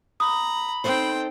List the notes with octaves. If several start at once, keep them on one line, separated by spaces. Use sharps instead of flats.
A#5 B5 D#6
C4 D#4 A4 C5 G5